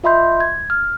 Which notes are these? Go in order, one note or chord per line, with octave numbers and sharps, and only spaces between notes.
F4 D#5 E5 B5 C6 G6
G#6
F6